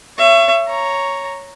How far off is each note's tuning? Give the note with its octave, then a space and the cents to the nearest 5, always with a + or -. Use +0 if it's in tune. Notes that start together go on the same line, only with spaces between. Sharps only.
C#5 +0 E5 +35
C#5 +0 A#5 +0